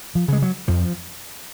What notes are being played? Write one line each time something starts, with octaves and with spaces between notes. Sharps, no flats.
F3
C#3 G#3
F#3
F2 F3